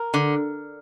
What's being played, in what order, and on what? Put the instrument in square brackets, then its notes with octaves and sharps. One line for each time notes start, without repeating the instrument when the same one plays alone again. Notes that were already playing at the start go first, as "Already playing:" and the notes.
Already playing: [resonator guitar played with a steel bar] A#4
D3